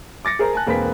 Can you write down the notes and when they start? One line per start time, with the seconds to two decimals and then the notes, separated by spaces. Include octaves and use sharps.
0.25 D6 A6 A#6 C#7
0.39 G#4 A#4 C5 A#5
0.53 G#5 A5 F#6
0.67 E1 A#3 C4 B4 G#5 B6